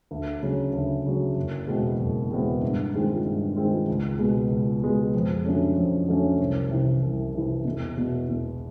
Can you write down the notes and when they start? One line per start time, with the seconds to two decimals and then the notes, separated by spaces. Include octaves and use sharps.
0.11 D2
0.43 C#3 F#3
0.73 D2
1.06 C#3 F#3
1.36 F#1
1.67 E2 B2 G#3 C4
1.99 F#1
2.31 E2 B2 G#3 C4
2.62 G2
2.94 D#3 G#3 C4 F4
3.26 G2
3.56 D#3 G#3 C4 F4
3.88 C#2
4.19 B2 G#3 B3
4.51 C#2
4.82 B2 G#3 B3
5.14 F2
5.45 D3 F#3 A3 C#4
5.77 F2
6.08 D3 F#3 A3 C#4
6.39 C2
6.71 C3 E3
7.02 C2
7.34 C3 E3
7.65 E1
7.97 E2 B2
8.28 E1